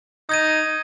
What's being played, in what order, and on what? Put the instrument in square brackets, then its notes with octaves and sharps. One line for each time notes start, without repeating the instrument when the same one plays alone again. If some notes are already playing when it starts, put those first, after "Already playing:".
[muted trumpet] D#4 [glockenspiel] D#6 G#6 D#7